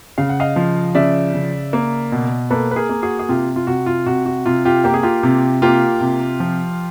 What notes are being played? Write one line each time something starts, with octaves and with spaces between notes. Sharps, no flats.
C#3 F5
F#5
D#5 F5
F3
C#3 D5 E5
C#3
A#3
B2
A#3 A4 B4
B4
G#4 A#4
A#3
F#4 G#4
G#4
C3 F4 G4
F4
C3 F#4
F4
C3 F#4
F#4
C3 F4
F4 G4
A#3 G4
G#4
F4 G4
C3
A#3 F4 G4
C3
F3